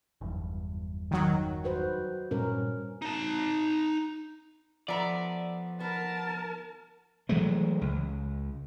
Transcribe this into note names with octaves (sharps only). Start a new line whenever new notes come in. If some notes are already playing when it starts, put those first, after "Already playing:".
F#1 E2 G2
D#3 F#3
F#4 B4 C5
G2 A#2 G3 C#4 A#4
D#4 A5
F3 B3 A4 D5 E5 A#5
B3 A#4 A5
E3 F#3 G#3 A3
C#2